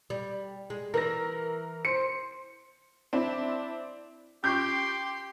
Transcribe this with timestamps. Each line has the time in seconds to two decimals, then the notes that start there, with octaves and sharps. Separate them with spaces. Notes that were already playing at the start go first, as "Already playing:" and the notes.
0.10 G3
0.70 G#3
0.94 E3 A#4 A#6
1.85 C5 C#7
3.13 C4 D4 E4
4.44 C#4 F4 G4 G5 C6 C#6 G6